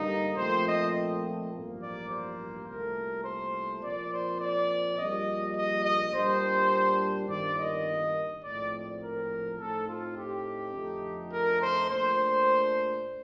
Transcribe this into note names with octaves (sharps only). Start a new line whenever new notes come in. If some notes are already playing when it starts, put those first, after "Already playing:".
Already playing: G2 D3 G3 A#3 D#4
A#2 F3 A3 C4 C5
D#5
A1 G2 F3 A#3
D5
C5
C2 A#2 A3 A#4
C5
A#2 F3 C4 D5
C5
D5
A#1 A#2 G3 D#5
D#5
D#5
A#2 G3 D4 C5
G1 G2 D#3 A#3 D5
D#5
A#1 A2 F3 C4 D5
A#4
A2 A3 C4 D#4 A4
F4
G4
F2 D3 F3 A3 D#4
A#4
C5
A#2 A3 D4 C5